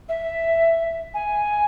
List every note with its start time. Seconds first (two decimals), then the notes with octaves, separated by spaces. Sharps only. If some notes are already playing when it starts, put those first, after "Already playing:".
0.09 E5
1.14 G#5